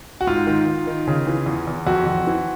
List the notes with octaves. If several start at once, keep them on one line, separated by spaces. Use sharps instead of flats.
F#4
G#2 F4
D#3
D#3
D#3
C#3
E3
E2
E2
F2 F#4
F2
E3